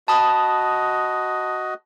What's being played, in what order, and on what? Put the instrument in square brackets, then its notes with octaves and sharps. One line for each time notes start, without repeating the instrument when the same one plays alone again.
[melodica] F#4 D#5 [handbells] A5 B5 D#6